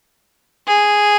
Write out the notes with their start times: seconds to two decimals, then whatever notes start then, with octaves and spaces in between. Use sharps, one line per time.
0.67 G#4